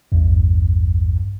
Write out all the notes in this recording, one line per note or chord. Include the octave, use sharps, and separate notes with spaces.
A1 E2 G2